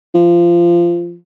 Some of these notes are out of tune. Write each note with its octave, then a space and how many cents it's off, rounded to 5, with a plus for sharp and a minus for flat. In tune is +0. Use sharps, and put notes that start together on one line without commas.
F3 -20